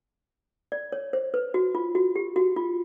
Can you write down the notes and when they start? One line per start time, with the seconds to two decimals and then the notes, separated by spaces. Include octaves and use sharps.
0.72 D5
0.92 C#5
1.13 C5
1.34 B4
1.54 F#4
1.75 F4
1.95 F#4
2.16 G4
2.36 F#4
2.56 F4